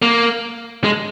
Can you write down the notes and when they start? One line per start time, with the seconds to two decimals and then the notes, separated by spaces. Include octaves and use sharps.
0.02 A#3
0.84 G#3